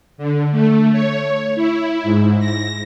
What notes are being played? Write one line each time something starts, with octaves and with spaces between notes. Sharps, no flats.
D3
A3
C#5
E4
G#2
A#6